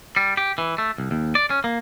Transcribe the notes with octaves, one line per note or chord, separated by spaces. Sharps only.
G3
G4
E3
A3
C2
D#2
D5
C#4
A#3